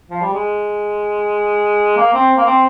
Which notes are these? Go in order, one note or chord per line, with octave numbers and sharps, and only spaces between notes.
F3
G3
G#3
A#3
C4
A#3
C4